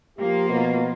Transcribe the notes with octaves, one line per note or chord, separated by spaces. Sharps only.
F3 A#3 F4 G4
B2